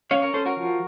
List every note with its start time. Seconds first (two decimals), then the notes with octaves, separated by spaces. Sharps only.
0.11 C#4 C#5 F5
0.22 A#4 C#5
0.34 C#4 A4 C5
0.46 F#4 A#4
0.57 F3